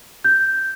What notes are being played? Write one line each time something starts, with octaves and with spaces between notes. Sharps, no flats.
G6